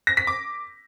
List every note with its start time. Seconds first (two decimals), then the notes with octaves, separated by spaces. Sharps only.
0.07 A#6
0.17 B6
0.27 D6